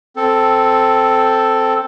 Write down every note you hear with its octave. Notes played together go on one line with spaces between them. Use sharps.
C4 A4